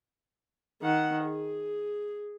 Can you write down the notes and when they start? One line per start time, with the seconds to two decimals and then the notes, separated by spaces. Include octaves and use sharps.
0.82 D#3 F#5
1.24 G#4